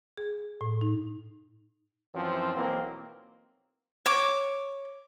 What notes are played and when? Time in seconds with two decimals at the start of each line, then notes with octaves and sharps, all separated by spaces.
0.17 G#4
0.61 A2
0.81 D#4
2.14 F#2 E3 F3 C4
2.56 B1 E3 A#3 C4
4.06 C#5 D6